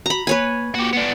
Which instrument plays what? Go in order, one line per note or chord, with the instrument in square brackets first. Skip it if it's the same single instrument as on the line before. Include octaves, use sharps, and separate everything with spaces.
[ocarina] F#4 [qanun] A#5 B5
[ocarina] A#3 [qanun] B4 C#5 G#5
[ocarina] A#3 [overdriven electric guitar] F#4 G4
[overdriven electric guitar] B3 D4